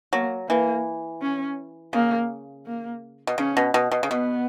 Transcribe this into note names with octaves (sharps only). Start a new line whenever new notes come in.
F#3 A#3
E3 A#3
C#4
C#3 A#3
A#3
B2
C#3 C#4
B2
B2
B2
C#3
B2 B3